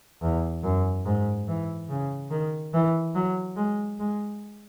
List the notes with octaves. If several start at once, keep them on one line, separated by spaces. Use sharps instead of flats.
E2
F#2
G#2
E3
C#3
D#3
E3
F#3
G#3
G#3